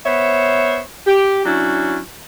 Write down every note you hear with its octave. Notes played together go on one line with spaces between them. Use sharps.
B3 C5 C#5 E5
G4
F#3 C#4 D4 E4